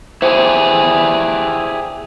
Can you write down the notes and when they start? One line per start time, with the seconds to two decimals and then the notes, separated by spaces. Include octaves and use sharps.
0.22 E4 G4 G#4 C5